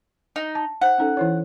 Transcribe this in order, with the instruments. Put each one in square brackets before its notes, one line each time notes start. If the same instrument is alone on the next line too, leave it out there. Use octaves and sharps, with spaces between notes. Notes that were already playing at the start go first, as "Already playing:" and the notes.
[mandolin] D#4
[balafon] A5
[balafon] D#4 C5 [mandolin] F#5
[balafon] C#4 D#4 A4
E3 E4 C#5